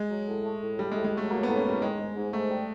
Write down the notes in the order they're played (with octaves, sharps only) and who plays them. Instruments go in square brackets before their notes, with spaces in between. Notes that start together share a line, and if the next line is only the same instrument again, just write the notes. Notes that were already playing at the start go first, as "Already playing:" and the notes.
Already playing: [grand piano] G#3
[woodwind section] F#3
A2
A3
A2
[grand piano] G3 [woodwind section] A3
[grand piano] G#3
[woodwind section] A2
[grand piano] G#3
[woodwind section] F#3 [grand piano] A3
[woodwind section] F#3 [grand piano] A#3
[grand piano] B3
[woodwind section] A2
[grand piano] C#4
[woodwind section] A2 [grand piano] G3
[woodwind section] D#3 [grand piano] G#3
[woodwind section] G#2
G#2
[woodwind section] G#2 [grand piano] A3
[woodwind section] G3